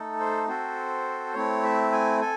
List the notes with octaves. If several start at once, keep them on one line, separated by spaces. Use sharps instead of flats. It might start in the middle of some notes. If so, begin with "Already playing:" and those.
Already playing: A3 D#4 A4
C5
C4 F#4 A4 C5
A3 C4 E4 C#5
E5
G#5
A4 G#5